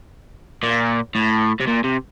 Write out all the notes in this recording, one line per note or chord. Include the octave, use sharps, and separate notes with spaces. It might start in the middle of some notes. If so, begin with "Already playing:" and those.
A#2
A2
C3
A#2
C3